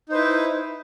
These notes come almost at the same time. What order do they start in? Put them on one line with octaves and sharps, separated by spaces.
D#4 C5 B4 E4